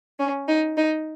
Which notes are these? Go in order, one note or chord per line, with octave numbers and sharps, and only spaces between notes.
C#4
D#4
D#4